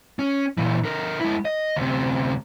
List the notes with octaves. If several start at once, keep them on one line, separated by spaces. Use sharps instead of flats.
C#4
A#2 E3
D3 A#4
G#3 E4
D#5
D2 C3